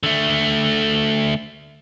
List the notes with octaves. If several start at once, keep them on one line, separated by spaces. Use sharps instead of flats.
D3 A3